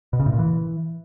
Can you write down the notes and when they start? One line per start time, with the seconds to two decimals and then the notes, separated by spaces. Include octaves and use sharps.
0.13 B2
0.20 C#3
0.26 A2
0.32 A#2
0.39 E3